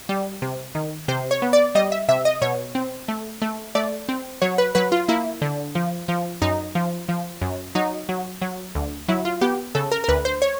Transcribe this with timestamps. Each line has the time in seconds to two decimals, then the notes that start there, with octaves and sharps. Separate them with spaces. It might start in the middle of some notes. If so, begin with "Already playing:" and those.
0.09 G3
0.42 C3
0.75 D#3
1.08 C3 C5
1.31 C#5
1.42 B3
1.53 D5
1.75 G3 D#5
1.92 E5
2.08 C3 E5
2.25 D#5
2.41 B2 C#5
2.75 C4
3.08 A3
3.42 A3
3.75 A3 D5
4.09 C4
4.42 F#3 C#5
4.58 B4
4.75 F#3 B4
4.92 F4
5.08 A#3 E4
5.42 D3
5.75 F3
6.08 F3
6.42 F#2 D#4
6.75 F3
7.09 F3
7.42 F#2
7.75 F#3 D#4
8.09 F#3
8.42 F#3
8.75 D2
9.08 F#3 E4
9.25 F4
9.41 B3 G4
9.75 C#3 A4
9.92 A#4
10.04 A#4
10.08 D2 B4
10.25 C5
10.42 C#5